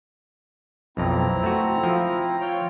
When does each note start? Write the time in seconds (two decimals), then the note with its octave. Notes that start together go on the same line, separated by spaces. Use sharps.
0.97 B1 F2 C4 E4 A#5
1.43 A3 F#4
1.83 F3
2.41 F4 C#5 G5